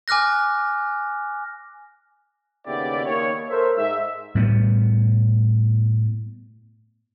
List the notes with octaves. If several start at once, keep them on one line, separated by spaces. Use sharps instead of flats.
G#5 D6 F6 F#6 A#6
D#2 C#3 B3 E4 G4 D5
D#2 C#5
A4 A#4 C5 C#5 E5
G#2 E5
A2 G3 A3 B3